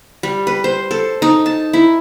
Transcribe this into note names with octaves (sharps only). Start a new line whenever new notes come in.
G3
B4
C5
A4
D#4
A5
E4